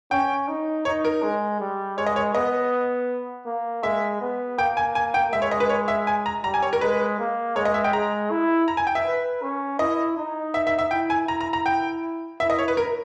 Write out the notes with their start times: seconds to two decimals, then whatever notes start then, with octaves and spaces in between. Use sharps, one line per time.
0.11 C#4 G5
0.48 D#4
0.85 D#4 C#5
1.05 A#4
1.22 G#3
1.60 G3
1.97 G#3 C#5
2.06 D#5
2.16 C#5
2.34 B3 D#5
3.46 A#3
3.83 G#3 E5
4.21 B3
4.58 A#3 G5
4.77 G#5
4.95 G#5
5.14 G5
5.33 G#3 E5
5.42 C#5
5.51 D#5
5.60 B4
5.69 C#5
5.88 E5
6.07 G#5
6.26 A#5
6.44 G3 A#5
6.54 G#5
6.62 C#5
6.73 A#4
6.81 G#3 B4
7.19 A#3
7.56 G#3 C#5
7.65 D#5
7.74 E5
7.84 G5
7.93 G#3 A#5
8.31 E4
8.68 A#5
8.77 G#5
8.87 G5
8.95 E5
9.05 B4
9.42 C#4
9.79 E4 D#5
10.17 D#4
10.54 E5
10.67 E5
10.79 E5
10.91 E4 G5
11.10 G#5
11.28 E4 A#5
11.41 A#5
11.53 A#5
11.66 G5
12.40 E4 E5
12.50 D#5
12.59 C#5
12.68 B4
12.77 A#4